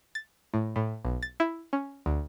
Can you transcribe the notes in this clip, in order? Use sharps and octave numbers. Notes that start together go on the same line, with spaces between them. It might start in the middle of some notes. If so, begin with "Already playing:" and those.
A6
A2
A2
B1
A6
E4
C#4
D2